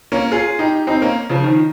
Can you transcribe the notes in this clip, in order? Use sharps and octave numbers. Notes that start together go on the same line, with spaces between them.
A#3 C#4
F4 G#4
D#4 G4
C4 D#4
A#3 C#4
C#3 F3
D#3